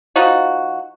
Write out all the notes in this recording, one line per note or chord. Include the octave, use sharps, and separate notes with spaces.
F3 D#4 F#4